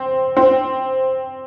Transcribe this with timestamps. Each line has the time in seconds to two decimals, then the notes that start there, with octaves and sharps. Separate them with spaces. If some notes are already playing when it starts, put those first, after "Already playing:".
Already playing: C4
0.37 C4